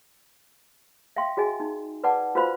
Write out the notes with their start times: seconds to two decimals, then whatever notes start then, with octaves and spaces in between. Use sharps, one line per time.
1.16 E5 F5 G5 C6
1.37 F#4 G#4 D#5 G#5
1.60 D#4
2.04 B4 D5 F#5 A5 D6
2.35 F4 F#4 B4 C5 F5 B5